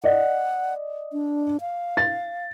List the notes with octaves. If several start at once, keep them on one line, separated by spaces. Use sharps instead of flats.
D5 D#5 F#5
D4
F5
A6